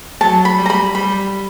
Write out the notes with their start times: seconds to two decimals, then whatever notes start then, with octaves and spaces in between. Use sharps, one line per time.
0.21 F#3 A5
0.45 B5
0.58 G3
0.66 A#5
0.70 B5
0.95 G3 B5